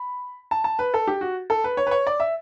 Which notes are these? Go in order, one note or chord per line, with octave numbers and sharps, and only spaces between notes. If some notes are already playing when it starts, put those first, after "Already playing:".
Already playing: B5
A5
A5
B4
A4
G4
F#4
A4
B4
C#5
B4
C#5
D5
E5